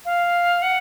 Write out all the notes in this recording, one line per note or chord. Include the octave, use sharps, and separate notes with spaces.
F5
F#5